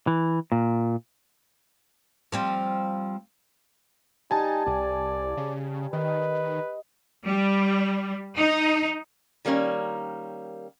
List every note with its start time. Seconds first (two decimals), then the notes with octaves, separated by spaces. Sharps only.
0.07 E3
0.52 A#2
2.32 F3 G3 C4
4.31 G3 D#4 G#5 A5
4.66 C2 D5
5.37 C#3
5.93 D#3 B4 D#5
7.26 G3
8.36 D#4
9.45 D#3 G3 A#3 C#4